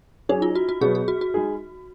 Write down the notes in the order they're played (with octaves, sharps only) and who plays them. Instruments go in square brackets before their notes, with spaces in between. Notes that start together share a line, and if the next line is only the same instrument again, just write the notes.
[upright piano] F#3 C#4 G#4 [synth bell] D#4
[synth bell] F4
F#4
F#4
[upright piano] B2 F#3 B3 [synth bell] G#4
[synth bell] G#4
F#4
F#4
[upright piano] G#3 D#4 G#4